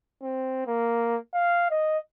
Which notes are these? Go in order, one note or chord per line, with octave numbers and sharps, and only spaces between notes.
C4
A#3
F5
D#5